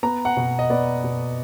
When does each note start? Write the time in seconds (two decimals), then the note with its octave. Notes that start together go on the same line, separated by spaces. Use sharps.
0.03 B3 A#5
0.25 F#5
0.37 B2
0.59 D#5
0.70 B3 D5
1.04 B2